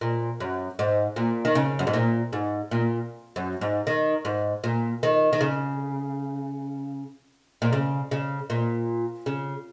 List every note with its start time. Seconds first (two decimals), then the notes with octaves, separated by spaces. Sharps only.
0.01 A#2
0.40 F#2
0.79 G#2
1.16 A#2
1.45 D#3
1.55 C#3
1.79 F#2
1.87 G#2
1.93 A#2
2.33 G#2
2.71 A#2
3.36 F#2
3.61 G#2
3.87 D#3
4.25 G#2
4.64 A#2
5.03 D#3
5.33 D#3
5.41 C#3
7.62 A#2
7.73 C#3
8.11 C#3
8.50 A#2
9.26 C#3